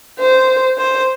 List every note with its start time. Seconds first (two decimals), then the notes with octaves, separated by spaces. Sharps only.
0.19 C5
0.78 C5